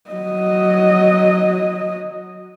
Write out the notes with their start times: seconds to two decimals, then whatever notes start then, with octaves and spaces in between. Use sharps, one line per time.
0.10 F#3 D#5